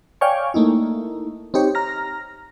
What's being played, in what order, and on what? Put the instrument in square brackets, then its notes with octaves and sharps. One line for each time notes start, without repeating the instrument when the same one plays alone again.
[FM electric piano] C#5 D5 F5 G5 G#5 C#6
A3 A#3 D#4 E4
C4 D#4 G4 C#5
A#5 F6 A#6